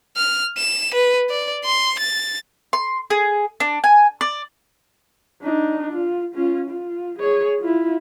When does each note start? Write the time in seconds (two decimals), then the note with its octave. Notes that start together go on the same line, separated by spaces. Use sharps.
0.17 F6
0.58 E7
0.94 B4
1.30 D5
1.65 C6
1.99 A6
2.73 C6
3.10 G#4
3.60 D4
3.84 G#5
4.21 D5
5.42 D4 D#4
5.93 F4
6.35 C#4 F4
6.70 F4
7.19 G#4 C#5
7.60 E4 F4